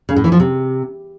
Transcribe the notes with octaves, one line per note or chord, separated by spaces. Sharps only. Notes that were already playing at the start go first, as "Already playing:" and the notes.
C#3
A2
E3
F3
C3